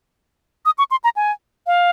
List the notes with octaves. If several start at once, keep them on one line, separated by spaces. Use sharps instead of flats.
D#6
C#6
C6
A#5
G#5
F5